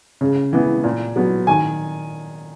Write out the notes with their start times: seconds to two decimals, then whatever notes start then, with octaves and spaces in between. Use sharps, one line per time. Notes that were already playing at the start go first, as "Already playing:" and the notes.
0.21 C#3
0.53 E3 B3
0.84 A#2
1.16 F#3 B3
1.47 D#3 G#5